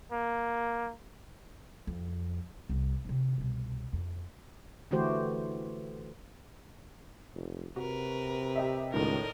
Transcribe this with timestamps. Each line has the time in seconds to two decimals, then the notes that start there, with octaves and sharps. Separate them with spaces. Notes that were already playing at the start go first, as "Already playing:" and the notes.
0.12 A#3
1.87 F2
2.69 C2
3.05 C3 D#3
3.38 C2 B2
3.93 F2
4.91 D3 E3 A3 F#4 G4 C5
7.34 F1
7.76 C3 F#4 A#4 B4
8.56 G4 D#5 E5
8.94 C#2 A2 D#3 A#4 D5 D#5